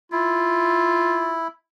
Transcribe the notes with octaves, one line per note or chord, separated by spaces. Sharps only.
E4 F4